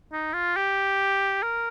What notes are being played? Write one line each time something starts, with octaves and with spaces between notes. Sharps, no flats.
D#4
F4
G4
A#4